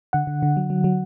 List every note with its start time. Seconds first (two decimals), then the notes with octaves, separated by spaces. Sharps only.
0.13 D3 F#5
0.27 D3
0.43 D3
0.57 F#3
0.70 F#3
0.84 F#3